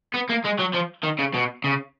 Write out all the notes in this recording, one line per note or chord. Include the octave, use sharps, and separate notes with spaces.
B3
A#3
G#3
F#3
F3
D#3
C#3
B2
C#3